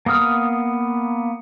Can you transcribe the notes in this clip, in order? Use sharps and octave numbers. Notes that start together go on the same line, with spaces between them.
A#3 B3 D#6 F6